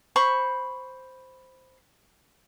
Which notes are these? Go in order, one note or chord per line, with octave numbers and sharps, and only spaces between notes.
C5 B5 C#6